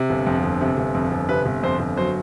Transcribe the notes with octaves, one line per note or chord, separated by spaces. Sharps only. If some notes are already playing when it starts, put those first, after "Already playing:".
Already playing: C3
G1
F2
G1
C3
G1
F2
G1
C3 B4
G1
F2 C5
G1
F#3 C5